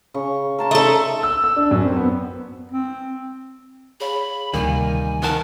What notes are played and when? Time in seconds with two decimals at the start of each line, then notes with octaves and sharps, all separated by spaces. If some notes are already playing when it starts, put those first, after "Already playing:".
0.14 C#3 C#6
0.59 A#4 A5 C6
0.71 A3 D#4 A4 D5
1.23 E6
1.44 E6
1.56 D4
1.71 F#2
1.84 C4
1.97 B3
2.71 C4
4.00 G#4 C#5 F5 B5
4.53 D2 C3 D#3 G3 A#3 G#5
5.22 D#3 A#4 F#5 A5